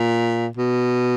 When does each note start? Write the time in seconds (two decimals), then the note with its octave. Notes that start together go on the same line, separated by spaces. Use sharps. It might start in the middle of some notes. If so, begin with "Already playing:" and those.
Already playing: A#2
0.57 B2